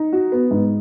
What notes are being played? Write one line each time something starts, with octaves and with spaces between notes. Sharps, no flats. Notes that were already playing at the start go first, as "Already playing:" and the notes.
Already playing: D#4
F#4
B3
G#2